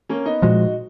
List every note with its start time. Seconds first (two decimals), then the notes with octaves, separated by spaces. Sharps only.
0.09 A#3 C#4
0.26 B3 D#4
0.42 A#2 F3 G#3 D#4 F#4